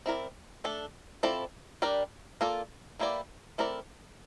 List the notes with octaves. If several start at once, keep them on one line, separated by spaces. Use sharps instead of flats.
C4 E4 A#4 D5
A3 D4 A4
F3 C4 E4 A4 D5
G3 D4 G4 A#4 D5
A#3 F4 A4 D5
E3 A#3 E4 G4 D5
A3 C4 E4 A#4 D5